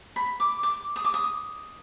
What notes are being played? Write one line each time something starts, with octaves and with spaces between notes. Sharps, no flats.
B5
D6
D6
D#6
D6
D#6